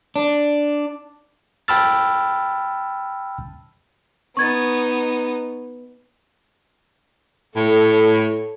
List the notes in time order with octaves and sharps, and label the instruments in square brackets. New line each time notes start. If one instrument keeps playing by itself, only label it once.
[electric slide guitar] D4
[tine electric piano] G5 A5 B5 E6 F6 A6
[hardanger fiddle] B3 D#4 [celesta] C#6 G#6 A6
[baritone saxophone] A2 [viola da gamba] A4 C#5